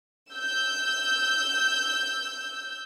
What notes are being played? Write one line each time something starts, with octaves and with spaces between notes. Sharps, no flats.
E6 G6